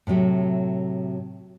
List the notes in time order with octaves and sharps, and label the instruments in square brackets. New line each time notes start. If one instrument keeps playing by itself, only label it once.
[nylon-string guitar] A2 C3 F#3 A3